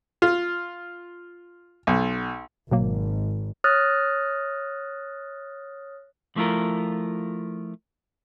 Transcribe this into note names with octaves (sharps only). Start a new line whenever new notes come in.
F4
B1
G#1 B2 F#3 A#3
C#5 D#6 F6 F#6 A6 A#6
F3 A3 E4 F4 A#4